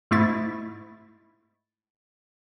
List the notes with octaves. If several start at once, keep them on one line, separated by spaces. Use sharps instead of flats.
G#2 A3 E4 A6